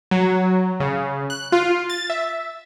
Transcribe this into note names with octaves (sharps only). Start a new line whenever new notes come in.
F#3
C#3
F#6
F4
A6
E5